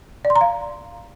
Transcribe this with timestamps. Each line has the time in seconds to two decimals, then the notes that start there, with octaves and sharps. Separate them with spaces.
0.25 D5
0.30 C6
0.36 A#5
0.41 F5